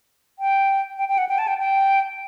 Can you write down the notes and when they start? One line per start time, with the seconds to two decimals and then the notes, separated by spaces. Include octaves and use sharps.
0.39 G5
0.98 G5
1.09 G5
1.18 F#5
1.29 G5
1.38 A5
1.48 G5
1.58 G5